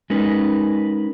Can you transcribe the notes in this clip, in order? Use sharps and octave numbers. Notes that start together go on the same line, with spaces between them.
G#3 C#4 D#4 A#4 B4